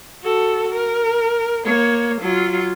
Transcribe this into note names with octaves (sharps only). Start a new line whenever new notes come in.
F#4 A4
A#4
A#3 C#5
F#3 F4